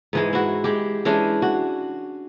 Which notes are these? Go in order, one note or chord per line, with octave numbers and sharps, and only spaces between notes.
G#2 E3 G#3
E4 F#4
G#3 G4
E3 G#3 C#4 D4
F#4